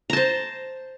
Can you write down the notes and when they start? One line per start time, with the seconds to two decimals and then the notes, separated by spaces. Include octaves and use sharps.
0.10 A#5
0.13 A5
0.17 C5